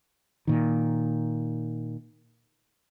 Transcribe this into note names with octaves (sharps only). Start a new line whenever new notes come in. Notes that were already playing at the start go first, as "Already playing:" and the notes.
A#2 D#3